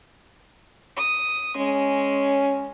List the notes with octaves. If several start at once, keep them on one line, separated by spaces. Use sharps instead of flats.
D#6
G#3 C#4